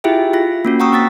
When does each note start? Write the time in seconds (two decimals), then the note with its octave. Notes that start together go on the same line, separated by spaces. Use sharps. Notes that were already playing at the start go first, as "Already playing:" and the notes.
0.04 E4 F4 G4 G#4 E5 G5
0.33 F4 A#6
0.65 A#3 C#4 F#4
0.80 F#5 G5 A#5 C#6 D#6 E6
0.92 C4 F#5 A6 B6